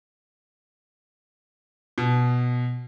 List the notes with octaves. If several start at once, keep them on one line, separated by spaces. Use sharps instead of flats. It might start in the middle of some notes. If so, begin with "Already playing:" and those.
B2